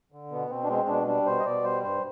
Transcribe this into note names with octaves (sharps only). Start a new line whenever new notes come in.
D3
B2 B3
B2 C4
D4
G#3 C4
B2 D4
G3 D4
B2 C5
D#5
B2 D5
G3 C5
G2 C5